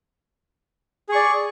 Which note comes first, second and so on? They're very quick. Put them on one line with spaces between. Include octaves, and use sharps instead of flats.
G#4 C#6 D5